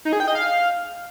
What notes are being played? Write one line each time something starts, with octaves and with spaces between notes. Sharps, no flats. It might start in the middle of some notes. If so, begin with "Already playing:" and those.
D#4
G#4
G5
D#5
F5